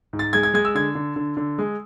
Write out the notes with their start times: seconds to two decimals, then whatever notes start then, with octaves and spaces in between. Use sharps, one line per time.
0.13 G#2
0.19 A6
0.33 G#3 G#6
0.43 G#6
0.54 G#3 G#6
0.65 E6
0.75 D3 G#6
0.95 D3
1.16 D3
1.37 D3
1.58 G#3